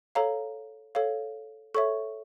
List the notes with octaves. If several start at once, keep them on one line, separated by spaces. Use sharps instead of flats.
A4 C#5 F5 A#5
A4 C#5 F5
A4 C#5 E5 C#6